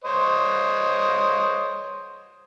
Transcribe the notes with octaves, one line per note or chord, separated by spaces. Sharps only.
C5 C#5 D#5